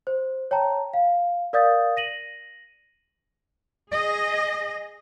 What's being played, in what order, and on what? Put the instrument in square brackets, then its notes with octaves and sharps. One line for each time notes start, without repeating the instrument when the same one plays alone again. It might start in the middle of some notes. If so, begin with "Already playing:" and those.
[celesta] C5
C#5 G5 A5 A#5
F5
A#4 D5 F5 D#6 G6 A6
A#6 D#7 F#7
[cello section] G#4 D#5